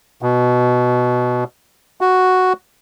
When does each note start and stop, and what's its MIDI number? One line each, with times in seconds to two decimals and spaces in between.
0.22 1.44 47
2.01 2.53 66